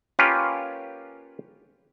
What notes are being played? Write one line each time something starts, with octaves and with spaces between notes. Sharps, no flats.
A#3 C#4 F4 G4 A#4 B4